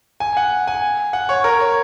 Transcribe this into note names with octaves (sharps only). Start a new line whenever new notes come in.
G#5
F#5
G#5
F#5
C#5
A#4
C#5